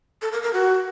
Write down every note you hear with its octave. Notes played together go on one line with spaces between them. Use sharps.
A4
A#4
A#4
F#4